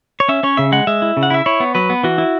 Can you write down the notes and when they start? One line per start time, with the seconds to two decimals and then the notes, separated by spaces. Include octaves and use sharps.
0.20 C#5
0.29 C#4 E5
0.43 C#4 C#5
0.57 C#3 E5
0.72 G#3 F#5
0.87 G#3 E5
1.02 E4
1.17 C#3
1.23 F#5
1.30 E4 E5
1.46 E4 C#5
1.60 B3
1.75 F#3 B4
1.90 B3
2.03 E3 F#4
2.18 E4